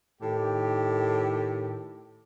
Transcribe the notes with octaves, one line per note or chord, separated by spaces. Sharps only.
A2 D#3 G4